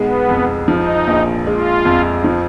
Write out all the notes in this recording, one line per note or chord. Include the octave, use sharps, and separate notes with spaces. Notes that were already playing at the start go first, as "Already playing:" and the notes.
Already playing: B1 G#3 B3
F2
F3 D#4
A#1
G#3 F4
F2
F3